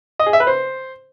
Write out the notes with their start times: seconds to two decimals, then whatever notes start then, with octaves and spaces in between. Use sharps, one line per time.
0.19 D#5
0.26 G#4
0.33 E5
0.40 B4
0.47 C5